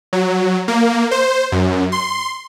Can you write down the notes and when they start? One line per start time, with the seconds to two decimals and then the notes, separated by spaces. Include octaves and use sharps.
0.13 F#3
0.68 A#3
1.11 C5
1.52 F#2
1.92 C6